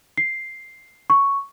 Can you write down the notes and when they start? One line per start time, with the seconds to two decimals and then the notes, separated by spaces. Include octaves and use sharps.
0.18 C7
1.10 C#6